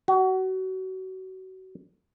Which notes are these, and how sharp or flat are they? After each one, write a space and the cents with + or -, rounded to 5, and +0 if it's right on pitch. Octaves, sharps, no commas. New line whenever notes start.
F#4 +25